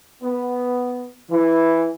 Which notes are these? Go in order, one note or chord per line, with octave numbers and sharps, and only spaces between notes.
B3
E3